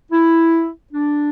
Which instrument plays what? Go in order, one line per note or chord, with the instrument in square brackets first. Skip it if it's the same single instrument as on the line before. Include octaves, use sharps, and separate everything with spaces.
[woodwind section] E4
D4